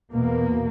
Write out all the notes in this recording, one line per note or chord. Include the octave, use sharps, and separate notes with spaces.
E2 B2 A#3